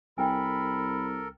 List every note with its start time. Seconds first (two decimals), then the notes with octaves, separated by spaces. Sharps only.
0.18 C2 A4 A#4 D#5 G5 G#5 B5